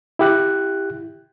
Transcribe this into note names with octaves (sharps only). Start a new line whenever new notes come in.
E4 G4 F#6